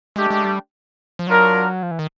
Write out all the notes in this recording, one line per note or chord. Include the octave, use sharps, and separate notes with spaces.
G#3 A3 D4 G4
G#3
G3
F3
F#3 D4 F4 A#4
F3
E3
D#3